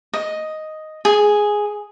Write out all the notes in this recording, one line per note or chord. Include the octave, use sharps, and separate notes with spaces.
D#5
G#4